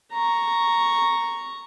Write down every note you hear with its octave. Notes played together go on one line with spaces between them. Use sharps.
A#5 C#6